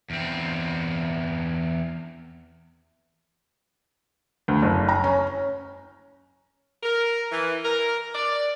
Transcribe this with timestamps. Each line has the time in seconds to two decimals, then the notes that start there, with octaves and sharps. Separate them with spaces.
0.10 E2 C4
4.48 D2
4.62 F#1
4.89 A#5
5.04 C#4
6.83 A#4
7.31 E3
7.63 A#4
8.14 D5